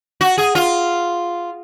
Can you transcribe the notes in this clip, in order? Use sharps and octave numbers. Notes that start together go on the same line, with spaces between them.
F#4
G#4
F4